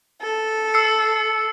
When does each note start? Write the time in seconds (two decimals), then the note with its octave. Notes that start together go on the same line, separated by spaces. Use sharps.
0.22 A4
0.74 E6 C7 C#7